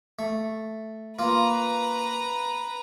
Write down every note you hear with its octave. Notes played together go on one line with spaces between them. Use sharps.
A3
A#3 F4 B4 A#5